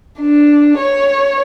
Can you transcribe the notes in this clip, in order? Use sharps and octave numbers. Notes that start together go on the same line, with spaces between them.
D4
C#5